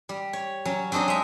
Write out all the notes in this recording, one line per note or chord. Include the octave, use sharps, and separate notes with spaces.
G3
C#5
F#3 C#4
F#3 C4 D4 D#4 D#5
G#3 E5